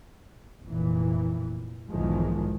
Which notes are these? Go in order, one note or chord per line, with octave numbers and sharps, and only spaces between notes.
F1 A#2 E3
B1 E2 G#2 D#3 F3 G#3